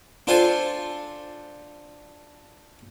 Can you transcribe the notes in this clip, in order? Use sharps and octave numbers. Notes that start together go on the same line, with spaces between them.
D4 F4 A4 C5 G#5